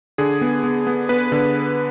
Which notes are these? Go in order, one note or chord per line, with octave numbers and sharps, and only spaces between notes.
D3 G#4
B3
B3
B3
B3 B4
D3